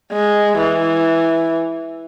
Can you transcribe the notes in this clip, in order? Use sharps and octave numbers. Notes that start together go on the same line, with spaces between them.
G#3
E3